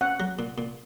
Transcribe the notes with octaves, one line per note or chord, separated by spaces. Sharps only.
C#4 F#5
F#3
A#2
A#2